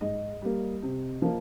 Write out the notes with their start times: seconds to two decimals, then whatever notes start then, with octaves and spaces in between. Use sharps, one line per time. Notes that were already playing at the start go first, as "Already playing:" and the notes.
0.01 G#2 D#5
0.42 G3 A#3
0.82 C3
1.22 F3 A#3